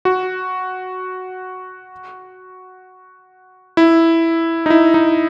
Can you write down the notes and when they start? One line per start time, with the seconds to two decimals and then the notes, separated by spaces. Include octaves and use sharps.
0.05 F#4
3.77 E4
4.66 D#4
4.70 E4
4.94 D#4